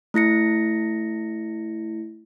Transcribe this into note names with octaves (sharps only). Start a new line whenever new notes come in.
A3 E4 A#6 C#7